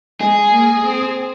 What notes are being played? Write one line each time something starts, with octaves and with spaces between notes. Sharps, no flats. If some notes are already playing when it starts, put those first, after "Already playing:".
G#3 G#4
A#3
C4